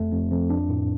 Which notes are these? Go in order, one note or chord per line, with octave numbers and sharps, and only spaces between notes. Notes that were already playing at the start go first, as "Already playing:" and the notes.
Already playing: F2 A3
F2
F2
D4
A2